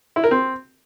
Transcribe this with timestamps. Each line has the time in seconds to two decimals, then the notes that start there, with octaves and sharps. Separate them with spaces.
0.16 E4
0.24 A#4
0.31 C4